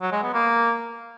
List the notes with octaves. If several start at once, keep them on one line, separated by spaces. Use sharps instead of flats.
F#3
G#3
B3
A#3